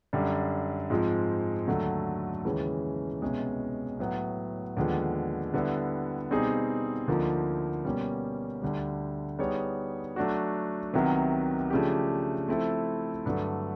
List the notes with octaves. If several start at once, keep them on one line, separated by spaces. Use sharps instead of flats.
F#2 D3 G3
G#2 F3 G#3 C4
D#2 D3 F#3 A3
D#2 C#3 E3 G#3 C#4
C2 B2 G#3 C#4
A2 F#3 B3
D#2 D3 F3 G#3 B3
D3 G3 B3 E4
B2 G3 C4 D#4 G#4
D2 D3 F3 A#3 D#4
B2 G3 A#3 C#4
D2 D3 G3
G3 B3 D#4 G#4 C#5
F#3 A3 D4 F#4
C2 C3 D#3 F#3 B3
C#3 F3 A3 D4 G4
F3 A3 C4 E4 A4
G2 D3 F#3 A3